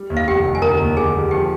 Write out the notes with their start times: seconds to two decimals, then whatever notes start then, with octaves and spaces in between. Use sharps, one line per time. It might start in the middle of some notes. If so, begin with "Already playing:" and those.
Already playing: G3
0.10 D#2
0.17 F5
0.28 F1 G4 G5
0.45 F1
0.55 G#5
0.62 D3 A#4 A#5
0.80 D#2
0.97 D3 G#4 G#5
1.14 G3
1.31 F3 G4 G5